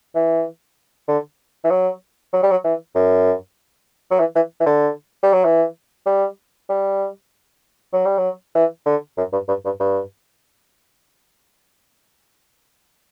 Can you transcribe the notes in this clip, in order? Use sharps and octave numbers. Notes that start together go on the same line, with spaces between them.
E3
D3
E3
F#3
F#3
G3
F#3
E3
F#2
F#3
E3
E3
E3
D3
G3
F#3
E3
G3
G3
F#3
G3
F#3
E3
D3
F#2
G2
G2
G2
G2